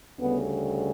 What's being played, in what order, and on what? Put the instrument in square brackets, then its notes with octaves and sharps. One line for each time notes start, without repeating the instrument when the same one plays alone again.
[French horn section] D2 C#3 G3 B3